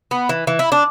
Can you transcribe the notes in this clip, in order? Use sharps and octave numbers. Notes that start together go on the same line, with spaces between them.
B3
E3
E3
E4
D4